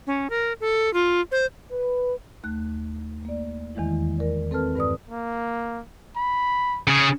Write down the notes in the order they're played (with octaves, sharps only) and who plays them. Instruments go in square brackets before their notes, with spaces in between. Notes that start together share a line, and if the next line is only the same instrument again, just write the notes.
[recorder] C#4
A#4
A4
F4
C5
[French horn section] B4
[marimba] D#2 A3 F#6
A#3 D5
E2 D#3 E3 G#3 E4
A#4 D5
C4 A4 B4 A5 F6
G2 B4 D5 D#6
[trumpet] A#3
B5
[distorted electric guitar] C#3 G#4